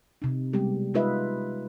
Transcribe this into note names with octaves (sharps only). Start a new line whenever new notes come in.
C3 D#4
G3 G#3 B3 G4
G#3 D#4 F4 B4 D#5 E5